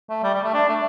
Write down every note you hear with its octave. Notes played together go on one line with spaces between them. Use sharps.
A3
G3
G3
A3
D4
A3